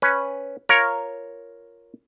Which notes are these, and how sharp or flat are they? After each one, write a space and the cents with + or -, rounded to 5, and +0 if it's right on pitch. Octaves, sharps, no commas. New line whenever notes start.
C#4 +0 B4 +0
F4 +0 A#4 +0 C#5 +0